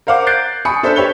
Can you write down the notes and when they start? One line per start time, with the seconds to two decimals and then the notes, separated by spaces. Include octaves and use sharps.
0.07 A#4 C5 F5 F#5 D6
0.26 F#6 G6 A6 C7 D7
0.65 G#5 B5 C#6 D#6 C#7
0.83 D4 A4 C5 E5
0.96 G4 B4 C#5 E5 G7